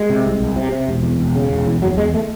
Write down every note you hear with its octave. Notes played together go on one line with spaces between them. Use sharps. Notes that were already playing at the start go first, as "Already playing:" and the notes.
Already playing: G#3
C3
C2
C2
C3
C3
E1
E2
E1
C#3
E1
E2
F#1 F#3
E2 G#3
A3